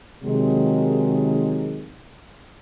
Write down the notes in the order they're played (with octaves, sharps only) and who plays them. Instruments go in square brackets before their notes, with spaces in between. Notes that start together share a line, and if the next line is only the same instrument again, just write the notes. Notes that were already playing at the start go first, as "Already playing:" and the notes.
[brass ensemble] C3 D#3 F#3 G#3